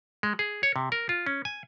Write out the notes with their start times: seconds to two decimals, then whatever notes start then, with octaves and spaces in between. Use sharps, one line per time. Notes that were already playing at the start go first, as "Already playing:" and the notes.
0.23 G#3
0.39 G#4
0.63 C#5
0.76 C3
0.92 A#4
1.09 F4
1.27 C#4
1.45 G#5